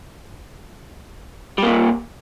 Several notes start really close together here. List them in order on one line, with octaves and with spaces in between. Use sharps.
G3 A#3 A#2